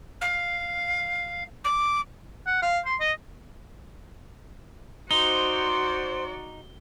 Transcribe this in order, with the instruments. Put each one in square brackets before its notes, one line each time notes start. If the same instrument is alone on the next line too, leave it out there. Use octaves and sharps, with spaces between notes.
[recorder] F5
D6
[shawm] F#5
F5
C6
D#5
[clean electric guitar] D#4 [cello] F#4 D5 [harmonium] C5 [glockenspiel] G7